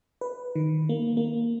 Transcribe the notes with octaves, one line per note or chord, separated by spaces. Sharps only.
B4
D#3
A#3
A#3